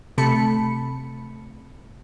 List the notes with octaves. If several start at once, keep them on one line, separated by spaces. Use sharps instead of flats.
C3 A3 A5 B5 C#7